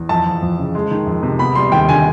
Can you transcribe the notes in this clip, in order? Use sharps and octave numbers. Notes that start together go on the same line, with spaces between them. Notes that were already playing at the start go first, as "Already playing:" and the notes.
Already playing: E2
F2 A5
F3
F2
C#3
G#3
D#3
F2
C3
B3 B5
G3 C6
D#2 G5
D3 G#5